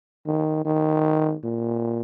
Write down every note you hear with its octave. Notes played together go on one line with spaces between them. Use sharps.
D#3
D#3
A#2